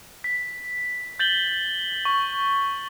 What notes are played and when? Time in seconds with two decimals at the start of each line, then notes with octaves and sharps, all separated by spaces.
0.24 B6
1.19 G6 A6 F#7 G7
2.05 C#6